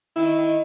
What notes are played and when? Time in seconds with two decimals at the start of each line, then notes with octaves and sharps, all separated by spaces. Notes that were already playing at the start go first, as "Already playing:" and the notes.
0.16 D#3 E4
0.37 D#3